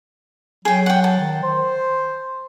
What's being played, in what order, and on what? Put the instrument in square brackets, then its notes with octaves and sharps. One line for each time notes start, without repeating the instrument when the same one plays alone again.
[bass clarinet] F#3 [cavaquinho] G#4 G5
[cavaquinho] F#5 G5
A5
[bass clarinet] D#3
C5